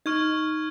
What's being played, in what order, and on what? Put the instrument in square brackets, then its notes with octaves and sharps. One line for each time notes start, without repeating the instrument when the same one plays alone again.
[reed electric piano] D#4 [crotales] C#6 F6 G#6